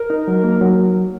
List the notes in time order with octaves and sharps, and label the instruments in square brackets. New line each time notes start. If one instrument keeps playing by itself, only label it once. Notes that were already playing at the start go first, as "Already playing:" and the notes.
Already playing: [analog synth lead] A#4
[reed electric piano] D#4
F#3
A#3
F#3